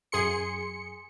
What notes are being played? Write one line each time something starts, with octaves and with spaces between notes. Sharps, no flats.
F#2 G#4 C6 C#7